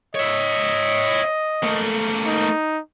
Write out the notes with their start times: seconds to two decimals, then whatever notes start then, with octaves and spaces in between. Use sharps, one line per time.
0.15 C#5 D#5 E5
1.63 A3 A#3
2.27 D#4